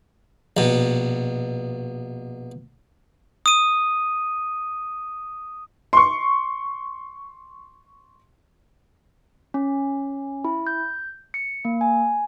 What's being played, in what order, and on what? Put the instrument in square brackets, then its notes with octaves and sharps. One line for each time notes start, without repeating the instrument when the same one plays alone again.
[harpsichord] A#1 B2
[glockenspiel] D#6 D#7
[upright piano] C6 C#6
[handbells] C#4
E4
G6
C#7
A#3
G#5